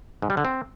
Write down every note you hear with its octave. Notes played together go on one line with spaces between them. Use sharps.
G#2
G3
D3
C4